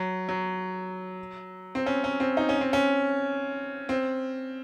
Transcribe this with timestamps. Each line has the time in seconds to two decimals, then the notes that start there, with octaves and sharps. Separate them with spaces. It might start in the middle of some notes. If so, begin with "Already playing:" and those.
Already playing: F#3
0.29 F#3
1.75 C4
1.86 C#4
2.04 C#4
2.20 C4
2.37 D#4
2.49 C#4
2.61 C4
2.73 C#4
3.89 C4